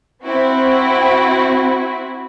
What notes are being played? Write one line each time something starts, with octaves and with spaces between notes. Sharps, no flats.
C4 E4 F#4